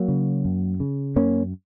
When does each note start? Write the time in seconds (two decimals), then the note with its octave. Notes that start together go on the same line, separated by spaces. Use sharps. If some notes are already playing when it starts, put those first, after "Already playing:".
Already playing: F#3 A#3
0.08 C#3
0.45 F#2
0.80 C#3
1.16 F#2 A#3 C#4